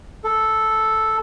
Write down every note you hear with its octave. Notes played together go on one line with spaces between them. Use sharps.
A4